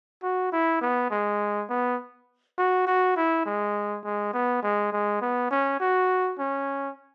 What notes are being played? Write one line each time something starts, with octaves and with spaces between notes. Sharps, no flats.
F#4
E4
B3
G#3
B3
F#4
F#4
E4
G#3
G#3
B3
G#3
G#3
B3
C#4
F#4
C#4